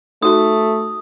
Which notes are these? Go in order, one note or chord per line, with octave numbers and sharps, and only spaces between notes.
A3 D#4 F#4 A4 D#6